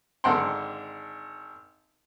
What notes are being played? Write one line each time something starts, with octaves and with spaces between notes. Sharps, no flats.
G#1 D3 F#5 G5 A#5 C6